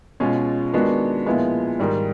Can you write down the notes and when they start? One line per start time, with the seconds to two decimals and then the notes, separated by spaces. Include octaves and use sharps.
0.20 B2 G#3 C#4 F4
0.73 D#3 G#3 B3 D4 F#4
1.26 A#2 F3 G#3 B3 E4
1.80 G#2 D#3 G3